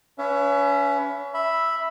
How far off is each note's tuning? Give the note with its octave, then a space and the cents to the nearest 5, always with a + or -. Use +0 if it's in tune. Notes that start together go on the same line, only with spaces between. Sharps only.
C#4 +30 B4 +0 E5 +35
E5 +0 B5 +0